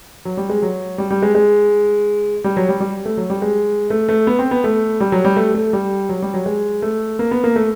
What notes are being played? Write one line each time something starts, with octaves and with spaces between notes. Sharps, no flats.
F#3
G3
G#3
F#3
G3
G3
G#3
G#3
G3
F#3
G3
G3
A3
F#3
G3
G#3
A3
A3
B3
C4
B3
A3
G3
F#3
G3
A3
A3
G3
F#3
G3
F#3
G#3
A3
A#3
B3
A#3
A3